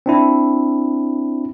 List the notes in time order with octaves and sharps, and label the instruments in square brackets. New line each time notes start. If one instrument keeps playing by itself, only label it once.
[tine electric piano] C4 D4 E4